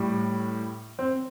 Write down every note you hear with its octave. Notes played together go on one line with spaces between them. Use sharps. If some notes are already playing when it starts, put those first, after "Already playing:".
Already playing: A2 G3
C4